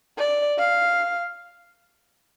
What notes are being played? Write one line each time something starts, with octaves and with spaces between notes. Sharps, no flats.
D5
F5